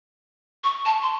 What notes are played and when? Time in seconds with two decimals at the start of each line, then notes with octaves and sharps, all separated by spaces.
0.64 C#6
0.86 A5
1.03 C6